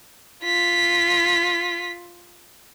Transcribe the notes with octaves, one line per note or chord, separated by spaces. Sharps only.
F4 B6